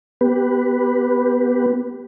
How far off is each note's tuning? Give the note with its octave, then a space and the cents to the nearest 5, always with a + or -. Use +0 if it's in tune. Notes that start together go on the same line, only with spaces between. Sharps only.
B3 +0 G4 +0 B4 +0